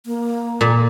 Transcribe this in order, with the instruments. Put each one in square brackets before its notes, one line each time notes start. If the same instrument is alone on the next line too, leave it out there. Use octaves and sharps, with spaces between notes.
[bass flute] A#3
[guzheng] A#2